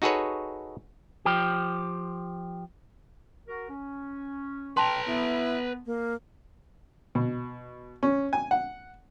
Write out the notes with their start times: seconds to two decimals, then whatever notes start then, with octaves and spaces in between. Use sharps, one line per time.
0.02 D#4 F#4 G#4 A4 B4 C#5
1.25 F3 G4
3.47 F#4 A#4
3.69 C#4
4.77 B4 G5 A5 A#5 C6
5.07 B3 E4
5.86 A#3
7.15 B2
8.03 C#4
8.33 G#5
8.51 F#5